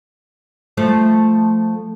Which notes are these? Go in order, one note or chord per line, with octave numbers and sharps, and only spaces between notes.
F3 A3 C5